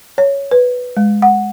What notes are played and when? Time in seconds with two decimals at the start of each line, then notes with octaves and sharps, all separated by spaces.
0.18 C#5
0.51 B4
0.97 G#3
1.22 F#5